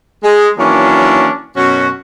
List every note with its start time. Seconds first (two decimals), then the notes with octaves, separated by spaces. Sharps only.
0.24 G#3
0.57 D#3 E3 F#3 A#3 C#4 D4
1.56 F#2 B2 C#4 F#4